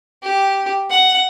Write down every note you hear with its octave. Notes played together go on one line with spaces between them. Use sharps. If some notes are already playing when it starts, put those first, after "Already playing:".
G4
F#5